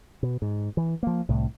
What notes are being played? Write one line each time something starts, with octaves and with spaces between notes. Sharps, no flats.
B2
G#2
E3
F3 A#3
C2 A2